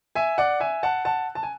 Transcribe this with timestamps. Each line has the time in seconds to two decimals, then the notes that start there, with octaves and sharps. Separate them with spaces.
0.15 E5 G#5
0.38 D5 F#5
0.60 E5 G#5
0.83 F#5 A5
1.05 F#5 A5
1.35 A5
1.43 G#5